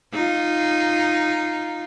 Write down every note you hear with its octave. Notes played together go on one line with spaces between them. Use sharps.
D#4 F4